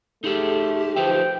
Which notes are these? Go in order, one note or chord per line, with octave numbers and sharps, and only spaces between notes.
A3 D#4 G4 G#4 E5
F3 D#4 B4 E5 G5